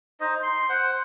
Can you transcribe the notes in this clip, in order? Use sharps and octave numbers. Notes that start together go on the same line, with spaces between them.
D#4 C5 D#5
C6
C5 F#5